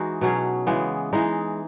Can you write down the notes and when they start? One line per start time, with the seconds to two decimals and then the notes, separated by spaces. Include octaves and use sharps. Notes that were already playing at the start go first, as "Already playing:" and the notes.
Already playing: E3 G#3 D#4 F#4
0.21 B2 F#3 C#4 G#4
0.67 C#3 E3 G#3 B3
1.13 E3 G#3 D#4